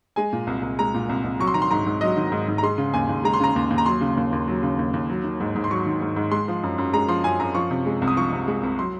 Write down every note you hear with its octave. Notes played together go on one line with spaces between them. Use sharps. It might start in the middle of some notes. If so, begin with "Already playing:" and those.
G#3 G#5
A#2
C2
C2
G#3 A#5
A#2
C2
C2
F#3 C#6
C6
D#3 A#5
C6
G#2 A#5
G#2
F#3 D#5
D#3
G#2
G#2
A#5
G#3 C6
C#3
D#2 G#5
D#2
G#3 A#5
C6
C#3 A#5
D#2
D#2
A#5
F#3 C6
C#3
D#2
D#2
F#3
C#3
D#2
D#2
F#3
D#3
G#2
G#2
C6
F#3 C#6
D#3
G#2
G#2
G#3 C6
F3
F#2
F#2
G#3 A#5
F3 C6
F#2 G#5
F#2 A#5
F3 C#6
C3
G#3
C2
D#6
F3 C#6
C3
G#3
C2
F#3 C6